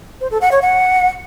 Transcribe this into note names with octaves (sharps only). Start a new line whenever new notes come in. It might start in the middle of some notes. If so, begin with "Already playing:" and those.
C5
A4
F#5
C#5
F#5